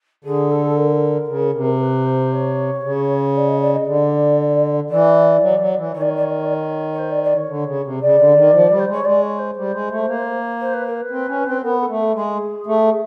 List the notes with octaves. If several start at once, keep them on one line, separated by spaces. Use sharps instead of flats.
D3 G#4
A4
A#4
C#3
C3
B4
C5
C#5
C#3
D5
D#5
D5
D#5
D3 D5
E3 D5
F#3
F#3
E3
D#3 C#5
D5
C#5
D5
C#5
D5
C#5
D5
C#5
C#5
C5
D5
D5
C#5
D3
C#3
C3
C#3 D5
D3
D#3
F3
G3
C5
G#3 C#5
G#3 D5
C#5
C5
G3
G#3
A3
A#3
C5
B4
A#4
B4
C4
C#4
C4
B3 A#4
A4
A3
A4
G#3 G#4
A3